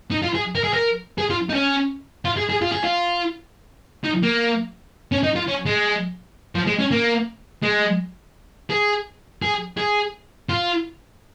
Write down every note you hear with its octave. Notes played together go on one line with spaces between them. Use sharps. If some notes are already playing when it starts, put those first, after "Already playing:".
D#4
F4
G#4
A#4
G#4
A#4
G#4
F4
D#4
C#4
F4
G#4
G#4
F4
G#4
F4
D#4
A#3
C#4
D#4
F4
C#4
G#3
F3
G#3
C#4
A#3
G#3
G#4
G#4
G#4
F4